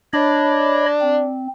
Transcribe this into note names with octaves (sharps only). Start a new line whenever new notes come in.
D4 C#5 D#5 B5
C4